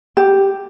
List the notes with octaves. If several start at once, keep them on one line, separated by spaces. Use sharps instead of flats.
G4